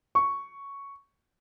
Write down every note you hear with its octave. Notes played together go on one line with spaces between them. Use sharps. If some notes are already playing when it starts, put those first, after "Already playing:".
C#6